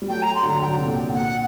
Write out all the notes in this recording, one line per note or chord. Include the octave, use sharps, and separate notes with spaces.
G3
F#3 A3 G5
A#5
C6
D3 F#3 A#5
D3 F#3 G5
C3
A#2 D3
A#2 F#5